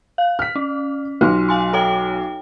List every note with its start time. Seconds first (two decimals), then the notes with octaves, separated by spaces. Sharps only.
0.18 F5
0.39 F6 B6
0.55 C#4
1.21 B1 F4 C6 F6
1.49 F5 G#5 C6
1.73 A4 C#5 G5